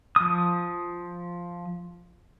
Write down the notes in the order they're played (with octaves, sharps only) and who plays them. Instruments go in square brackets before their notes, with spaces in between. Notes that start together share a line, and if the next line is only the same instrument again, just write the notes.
[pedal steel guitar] F3 D#6